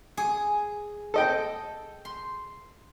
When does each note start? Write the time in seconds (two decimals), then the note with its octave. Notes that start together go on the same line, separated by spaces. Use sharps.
0.17 G#4
1.14 A4 D#5 G5
2.05 C6